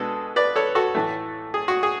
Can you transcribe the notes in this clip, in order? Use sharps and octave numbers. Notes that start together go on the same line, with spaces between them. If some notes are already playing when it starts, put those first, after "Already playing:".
Already playing: B2 G#3 B3 D4 A4
B4 D5
A4 C#5
F#4 A4
A2 E3 A3
G#4
F#4
G#4